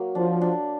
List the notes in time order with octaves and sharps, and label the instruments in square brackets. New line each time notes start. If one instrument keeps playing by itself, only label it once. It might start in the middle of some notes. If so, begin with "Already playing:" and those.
Already playing: [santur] F#3 A#3
[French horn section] F3 [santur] D4
[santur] D4